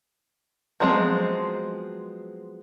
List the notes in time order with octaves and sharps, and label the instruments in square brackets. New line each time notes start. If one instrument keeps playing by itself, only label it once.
[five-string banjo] F3 F#3 G#3 B3 C4